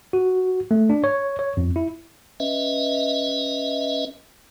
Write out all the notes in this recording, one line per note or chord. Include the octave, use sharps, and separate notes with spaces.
F#4
A3
D4
C#5
C#5
F2
E4
C#4 B4 D#5 E5